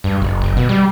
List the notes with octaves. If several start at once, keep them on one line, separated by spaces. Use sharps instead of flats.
G2
F#1
F#1
B2
G3